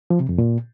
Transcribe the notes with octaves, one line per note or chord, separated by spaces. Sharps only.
F3
C3
F2
A#2